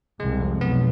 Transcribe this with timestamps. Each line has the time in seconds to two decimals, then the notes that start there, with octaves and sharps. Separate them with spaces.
0.20 C2 C3 G#3
0.40 F2
0.60 B1 B2 B3